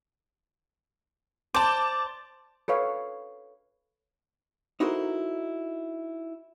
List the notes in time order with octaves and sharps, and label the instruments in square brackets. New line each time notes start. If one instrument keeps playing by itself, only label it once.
[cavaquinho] C5 D5 [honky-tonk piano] A5 D6
[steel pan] A4 B4 C#5 F5
[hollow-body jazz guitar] D#4 E4 F#4 A4 A#4 C5